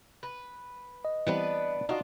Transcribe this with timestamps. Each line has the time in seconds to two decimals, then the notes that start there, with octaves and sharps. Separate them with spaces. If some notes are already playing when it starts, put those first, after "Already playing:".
0.23 B4
1.05 D#5
1.27 E3 G3 B3 C4 D4 B4
1.89 D4 D#4 F4 F#4 D#5